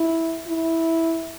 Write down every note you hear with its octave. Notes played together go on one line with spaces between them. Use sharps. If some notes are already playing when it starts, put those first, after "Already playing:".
Already playing: E4
E4